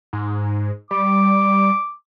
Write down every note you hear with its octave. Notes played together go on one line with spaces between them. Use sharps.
G#2
G3 D6